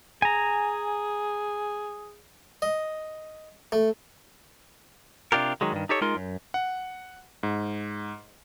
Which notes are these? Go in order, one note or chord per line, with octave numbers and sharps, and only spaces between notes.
G#4 G#5 A#5
D#5
A3
C3 D4 F4 G4 A#4
D#3 F#3 G#3
G2 D#3
D#4 G4 A4 C#5
G#3 D#4 F4 A#4 C6
F#2
F#5
G#2